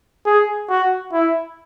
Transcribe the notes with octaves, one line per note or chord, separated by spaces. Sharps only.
G#4
F#4
E4